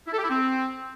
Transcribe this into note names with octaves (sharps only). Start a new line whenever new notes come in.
E4
A4
G4
E4
C4